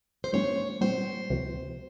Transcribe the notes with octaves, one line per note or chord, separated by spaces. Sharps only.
C5
G#2 F3 A#3 C#4 C#5
A#2 G3 C4 C5
C#2 C3 F3